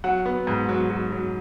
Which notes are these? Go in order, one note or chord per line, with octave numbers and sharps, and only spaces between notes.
F#3 F#5
B3
G#2
F#3
F#3
F#3